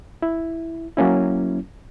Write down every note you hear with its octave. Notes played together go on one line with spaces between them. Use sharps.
E4
F#3 A#3 C#4 E4